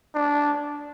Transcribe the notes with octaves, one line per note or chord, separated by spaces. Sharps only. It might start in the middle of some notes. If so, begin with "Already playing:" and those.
D4